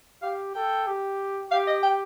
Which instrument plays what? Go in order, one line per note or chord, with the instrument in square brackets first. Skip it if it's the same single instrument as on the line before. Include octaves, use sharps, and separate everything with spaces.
[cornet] G4 [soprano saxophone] F5
[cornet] A4 [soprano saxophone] G5
[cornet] G4
[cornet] G4 [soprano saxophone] F5
[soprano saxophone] D#5
G5